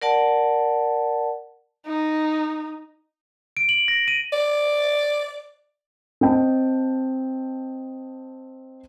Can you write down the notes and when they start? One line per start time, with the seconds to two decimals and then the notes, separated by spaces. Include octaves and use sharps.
0.02 A#4 D5 F#5 A5
1.86 D#4
3.57 D7
3.69 F#7
3.88 A#6
4.08 D#7
4.33 D5
6.21 C4 D#5 G5 A5